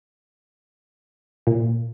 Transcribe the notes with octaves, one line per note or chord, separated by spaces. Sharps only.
A#2